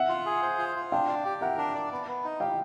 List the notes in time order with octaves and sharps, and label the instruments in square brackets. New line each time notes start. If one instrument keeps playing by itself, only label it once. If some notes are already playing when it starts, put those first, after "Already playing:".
Already playing: [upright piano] E5 F#5
[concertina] F4
G#4
C5
F4
F4
[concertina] D4 [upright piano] F5 G5
[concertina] D5
G4
[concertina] A#4 [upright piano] E5 F#5
[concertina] D4
D5
B3
B3
D#4
[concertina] G4 [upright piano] F5 G5